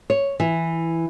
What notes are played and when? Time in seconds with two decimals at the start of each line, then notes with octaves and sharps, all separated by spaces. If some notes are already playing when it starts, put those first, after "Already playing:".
0.10 C#5
0.40 E3